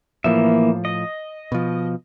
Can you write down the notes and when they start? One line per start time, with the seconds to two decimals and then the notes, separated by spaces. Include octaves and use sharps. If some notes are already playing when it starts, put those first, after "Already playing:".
0.24 A2 E3 F3 A#3 E5
0.85 D#5
1.52 B2 F3